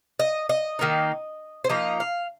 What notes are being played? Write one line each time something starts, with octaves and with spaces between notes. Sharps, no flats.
D#5
D#5
D#3 A#3 D#4
C5
F3 A#3 D#4 D#5
F5